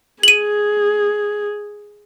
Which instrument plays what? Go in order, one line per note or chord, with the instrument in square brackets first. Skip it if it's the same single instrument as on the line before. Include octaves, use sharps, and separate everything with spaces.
[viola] G#4 [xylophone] D#7 F#7